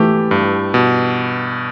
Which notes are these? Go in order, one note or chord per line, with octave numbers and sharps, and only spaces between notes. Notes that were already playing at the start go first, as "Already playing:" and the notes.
Already playing: E3 A3 G4
G2
B2